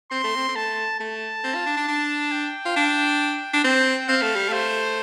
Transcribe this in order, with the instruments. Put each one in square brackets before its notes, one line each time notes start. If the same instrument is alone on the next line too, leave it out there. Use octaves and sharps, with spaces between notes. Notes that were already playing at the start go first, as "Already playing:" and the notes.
[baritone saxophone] C4 [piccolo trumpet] C6
[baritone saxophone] A3
C4
C4
[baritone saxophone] A3 [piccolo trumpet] A5
[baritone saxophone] A3 [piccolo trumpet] A5
[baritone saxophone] C4
F4
D4
D4
D4
[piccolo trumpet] G5
[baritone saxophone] F4
D4
D4
[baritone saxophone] C4 [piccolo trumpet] G5
[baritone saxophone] C4 [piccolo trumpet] F5
[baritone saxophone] A3
G3
[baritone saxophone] A3 [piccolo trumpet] C5